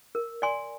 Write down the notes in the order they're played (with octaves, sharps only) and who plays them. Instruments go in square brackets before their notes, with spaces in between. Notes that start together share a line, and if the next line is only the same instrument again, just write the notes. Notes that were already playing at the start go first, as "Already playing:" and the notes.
[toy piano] A#4
D5 G#5 C6